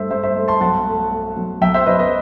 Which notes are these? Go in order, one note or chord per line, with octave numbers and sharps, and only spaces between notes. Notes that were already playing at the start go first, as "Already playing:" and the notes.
Already playing: G2 A3 C5 E5
G2 C5 E5
C5 E5
A3
A5 C6
B1 F#5 A5
A3
A3
B1
B1 E5 G5
C5 E5
B1 B4 D#5
B4 D#5